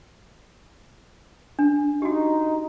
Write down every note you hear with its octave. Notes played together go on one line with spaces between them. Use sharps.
D4
D#4 F#4 G4